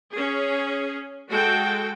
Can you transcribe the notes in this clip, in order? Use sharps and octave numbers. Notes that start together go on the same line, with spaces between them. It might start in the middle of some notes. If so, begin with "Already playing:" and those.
C#4 G#4
G#3 F#4 A4 G5